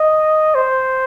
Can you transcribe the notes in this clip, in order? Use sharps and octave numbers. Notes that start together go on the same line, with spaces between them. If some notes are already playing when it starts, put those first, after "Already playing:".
Already playing: D#5
C5